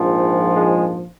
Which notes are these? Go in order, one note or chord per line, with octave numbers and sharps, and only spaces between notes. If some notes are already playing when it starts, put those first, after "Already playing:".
Already playing: A#1 G#2 F3
G#3